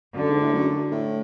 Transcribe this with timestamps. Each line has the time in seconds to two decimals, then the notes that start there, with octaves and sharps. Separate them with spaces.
0.15 F#2 D3
0.28 G#2
0.41 A2
0.53 F#2
0.92 A2